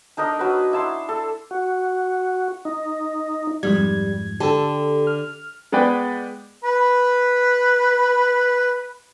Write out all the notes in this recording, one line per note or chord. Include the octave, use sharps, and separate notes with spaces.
D4 D#4 A#4 D#5
F#3 B4
E4 A5 C6
A4
F#4
D#4
F2 G#2 G3 G#6
D3 G4 A4 A5
F6
G#3 B3 B4 D5 G5
B4 B5